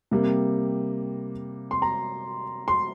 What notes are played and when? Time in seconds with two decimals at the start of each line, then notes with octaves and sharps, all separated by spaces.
0.11 C3 G3 A#3
1.71 C6
1.82 A#5
2.68 C6